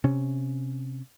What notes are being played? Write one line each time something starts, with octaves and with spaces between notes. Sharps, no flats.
C3 C#4